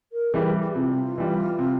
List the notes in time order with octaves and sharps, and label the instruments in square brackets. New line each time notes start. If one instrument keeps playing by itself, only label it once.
[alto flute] A#4
[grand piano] E3 G3 [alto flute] G#4
[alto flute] G4
[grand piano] C3 [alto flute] F4
[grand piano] E3 G3
C3